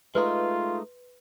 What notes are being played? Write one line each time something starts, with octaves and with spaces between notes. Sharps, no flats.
G#3 A3 D#4 F4 B4 C6